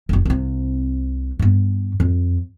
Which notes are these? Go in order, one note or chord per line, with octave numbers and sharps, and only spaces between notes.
F1 B1
C2 C3
G2 B3
F2